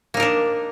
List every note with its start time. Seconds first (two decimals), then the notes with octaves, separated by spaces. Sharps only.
0.14 A#3
0.17 D#4
0.20 A#4
0.22 D4